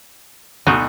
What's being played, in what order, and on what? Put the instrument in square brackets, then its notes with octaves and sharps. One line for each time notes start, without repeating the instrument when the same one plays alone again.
[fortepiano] D2 B2 F#6 [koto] D#4 F#4